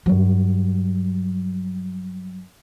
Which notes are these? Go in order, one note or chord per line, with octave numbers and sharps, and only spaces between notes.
G2 F#3